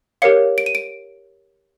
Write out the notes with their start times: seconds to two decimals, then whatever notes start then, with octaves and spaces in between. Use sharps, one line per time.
0.22 G4 A#4 C#5 F5 C#7
0.58 D7
0.66 D#7
0.75 D7